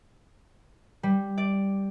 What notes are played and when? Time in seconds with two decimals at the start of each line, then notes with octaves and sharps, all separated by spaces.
1.03 G3
1.38 D5